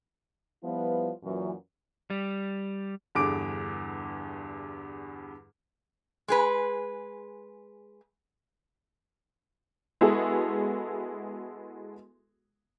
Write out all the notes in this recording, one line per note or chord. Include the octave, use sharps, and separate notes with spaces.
F3 G3 B3 E4 F4 B4
F#2 A#2 E3
G3
E2 G2 D3 G#4 D6 D7
G#3 G#4 B4
G#3 B3 E4 F#4 G#4 A4